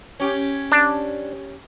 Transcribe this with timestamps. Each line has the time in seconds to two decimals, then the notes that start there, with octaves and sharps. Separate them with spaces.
0.20 C#4 G4
0.72 D4